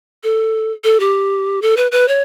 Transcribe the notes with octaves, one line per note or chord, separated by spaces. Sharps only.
A4
A4
G4
A4
B4
B4
C#5